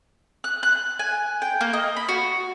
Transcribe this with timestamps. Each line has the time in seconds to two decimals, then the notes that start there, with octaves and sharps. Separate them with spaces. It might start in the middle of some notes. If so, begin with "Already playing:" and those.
0.44 F#6
0.63 F#6
0.99 G#5
1.42 G5
1.61 A#3
1.73 D#5
1.97 B5
2.09 F#4